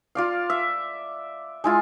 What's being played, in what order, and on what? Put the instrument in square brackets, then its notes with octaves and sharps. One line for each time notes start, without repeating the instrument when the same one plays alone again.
[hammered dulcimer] F4 D5 F5
E5
G#3 E4 F4